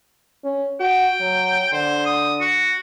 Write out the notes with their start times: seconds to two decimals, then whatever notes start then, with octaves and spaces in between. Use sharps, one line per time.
0.44 C#4
0.80 F#4 G5
1.21 F#3
1.73 D3 C5
2.06 D#6
2.40 F#4